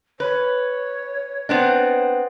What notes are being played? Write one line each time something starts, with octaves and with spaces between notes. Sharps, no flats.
B4 C#5
B3 C4 D4